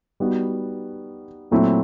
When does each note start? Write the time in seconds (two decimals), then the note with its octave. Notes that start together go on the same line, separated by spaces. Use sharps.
0.20 G3 B3 D#4 F#4
1.51 A#2 F#3 A3 C4 E4